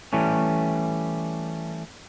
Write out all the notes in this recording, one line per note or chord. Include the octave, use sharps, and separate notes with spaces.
E3 G3 A3 C#4